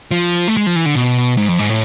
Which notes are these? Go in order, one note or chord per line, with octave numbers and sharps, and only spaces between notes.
F3
A3
G#3
F3
E3
D3
B2
G#2
F2
G#2
A2